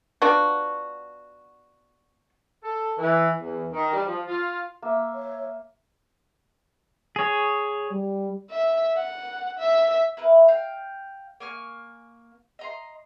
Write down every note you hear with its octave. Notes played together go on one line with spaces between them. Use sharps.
B3 D4 F4 F#4
A4
E3
E2
D#3
G3
F3
F4
A#3 E5
C#5
G#4 C#5
G3
E5
F#5
E5
E4 A#4 B4
F5 G5
A#3 G#5 C#6 F6
D#5 A#5 C6